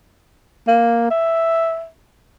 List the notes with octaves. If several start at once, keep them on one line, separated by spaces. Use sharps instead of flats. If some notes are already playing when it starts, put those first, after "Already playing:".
A#3
E5